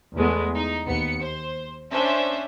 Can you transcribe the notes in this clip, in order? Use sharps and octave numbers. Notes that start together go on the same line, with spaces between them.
E2 G#3 A3 B3
D#4
D#2 B3 C#7
C5
C#4 D4 C5 E5